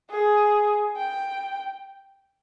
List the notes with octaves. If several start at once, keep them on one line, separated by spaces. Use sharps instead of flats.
G#4
G5